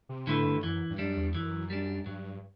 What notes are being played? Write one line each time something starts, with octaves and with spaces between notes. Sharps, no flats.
C3
A2 D3 A3 E4 B4
G2
F#2 E3
G2
F#2 G3 D4
E2
F#2 E3
G3 D4
G2 F#3